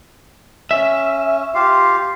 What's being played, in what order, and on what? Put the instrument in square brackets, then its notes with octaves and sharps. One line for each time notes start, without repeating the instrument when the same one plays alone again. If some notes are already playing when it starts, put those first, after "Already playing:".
[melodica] C#4 [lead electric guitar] E5
[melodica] F4 G4 F5